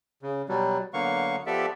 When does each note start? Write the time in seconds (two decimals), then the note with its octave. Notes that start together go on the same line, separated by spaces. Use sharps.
0.22 C#3
0.49 B2 F#3 G3
0.94 D3 F#3 A#3 B3 F5 C#6
1.46 F3 B3 G4 A4 D5 E5